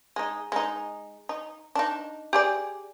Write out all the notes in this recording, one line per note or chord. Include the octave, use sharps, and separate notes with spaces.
G#3 D#4
G#3 D#4
D#4
D4 D#4
G4 G#4 D5